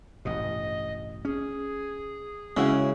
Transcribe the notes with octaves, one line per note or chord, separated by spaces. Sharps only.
A1 G2 B2 D#5
C#4 G#4
C#3 G#3 C#4 E4 F#4